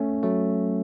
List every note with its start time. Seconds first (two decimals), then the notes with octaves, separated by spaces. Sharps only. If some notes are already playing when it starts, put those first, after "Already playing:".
Already playing: A3 C#4
0.23 F#3 A3